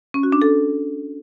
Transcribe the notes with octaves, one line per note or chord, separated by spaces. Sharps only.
C#4
F#4
D4
A4